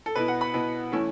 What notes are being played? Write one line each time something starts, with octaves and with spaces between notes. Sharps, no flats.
A4
B2 B3 E4 B4
F#5
B5
B2 B3 E4
E3 A3 C#4 E4